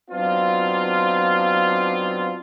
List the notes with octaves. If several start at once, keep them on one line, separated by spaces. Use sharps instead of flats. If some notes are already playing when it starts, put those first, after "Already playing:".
F#3 B3 C4 D4 D#4 F4